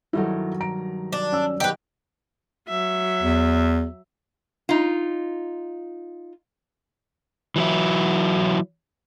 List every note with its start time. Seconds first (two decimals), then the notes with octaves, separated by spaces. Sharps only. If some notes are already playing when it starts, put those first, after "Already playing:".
0.13 G2 D#3 F#3 E4 A4
0.60 A#5 D7
1.12 D4
1.32 C#4 E6
1.60 D#3 G4 B4 D#5 F#5 G5
2.68 F#3 E5
3.22 E2
4.69 D#4 F4
7.56 E3 F#3 E4